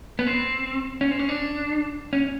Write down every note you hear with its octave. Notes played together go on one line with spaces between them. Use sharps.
B3
C4
C#4
C4
C#4
D4
C#4